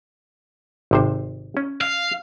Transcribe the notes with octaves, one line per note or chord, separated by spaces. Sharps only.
G#1 C3 C5
C#4
F5